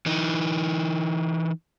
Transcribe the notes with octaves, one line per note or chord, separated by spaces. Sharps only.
E3 D#4